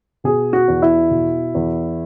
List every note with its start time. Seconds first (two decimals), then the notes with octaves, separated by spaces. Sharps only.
0.24 B2 G#4
0.53 F#4
0.68 E2
0.82 E4
1.11 B2
1.55 E2